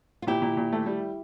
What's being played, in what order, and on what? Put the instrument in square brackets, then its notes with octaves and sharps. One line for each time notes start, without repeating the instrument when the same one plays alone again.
[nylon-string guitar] F4
[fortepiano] A#2 [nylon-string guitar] E4 G4
[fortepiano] A#2
A#2
A3
G3